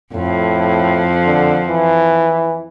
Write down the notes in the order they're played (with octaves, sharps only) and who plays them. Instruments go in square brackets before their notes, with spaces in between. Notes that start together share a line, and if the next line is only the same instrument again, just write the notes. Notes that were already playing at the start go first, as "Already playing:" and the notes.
[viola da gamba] F2 [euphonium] A2
[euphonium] D3
E3